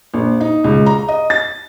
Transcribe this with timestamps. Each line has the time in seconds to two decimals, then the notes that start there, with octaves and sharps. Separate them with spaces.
0.14 A#1
0.41 D#4
0.64 C#2
0.86 A#5
1.08 D#5
1.30 A6